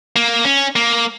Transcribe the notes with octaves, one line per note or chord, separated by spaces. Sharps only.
A#3
C#4
A#3